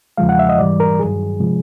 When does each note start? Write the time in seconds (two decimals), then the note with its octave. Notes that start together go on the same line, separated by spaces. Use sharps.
0.17 E2 C#3 F3 G#3 F5
0.29 F#5
0.39 E5
0.49 D#5
0.58 G#2 E3 G3 D5
0.80 A#4
0.99 G2 D#3 F#3 G#4
1.40 C3 F3 G#3